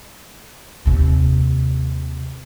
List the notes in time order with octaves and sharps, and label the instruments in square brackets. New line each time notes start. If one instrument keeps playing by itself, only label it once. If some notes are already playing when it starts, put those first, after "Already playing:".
[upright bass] D#2 C3